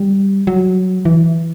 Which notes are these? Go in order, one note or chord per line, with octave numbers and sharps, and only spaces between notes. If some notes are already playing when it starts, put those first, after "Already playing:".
Already playing: G3
F#3
E3